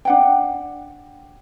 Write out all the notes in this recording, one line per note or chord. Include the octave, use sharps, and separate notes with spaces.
D4 F#5 G5